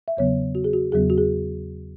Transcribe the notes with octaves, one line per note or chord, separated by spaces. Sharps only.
E5
E2 C#3 F#3 B3 C#5
F#4
G#4
F#4
E2 C#3 F#3 B3 G#4
F#4
G#4